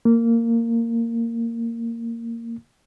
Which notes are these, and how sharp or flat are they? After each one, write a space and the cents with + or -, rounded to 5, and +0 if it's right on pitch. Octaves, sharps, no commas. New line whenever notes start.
A#3 -15